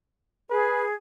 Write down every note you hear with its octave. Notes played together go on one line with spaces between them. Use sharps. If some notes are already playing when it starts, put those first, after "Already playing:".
G#4 B4